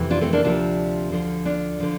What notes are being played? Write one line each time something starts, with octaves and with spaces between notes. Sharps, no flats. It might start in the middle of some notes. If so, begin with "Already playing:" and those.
Already playing: F2 C3 E3
D4 F4
A3 C4
A#3 D4
D2 C3 F3 D4 F4
D2 D3 F3
D4 F4
D3 F3